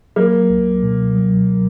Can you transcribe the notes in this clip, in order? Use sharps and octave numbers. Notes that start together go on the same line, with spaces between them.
F#3 A#3
C#2
B2
F#3